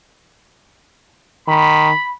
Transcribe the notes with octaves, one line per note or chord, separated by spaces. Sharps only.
D#3 B5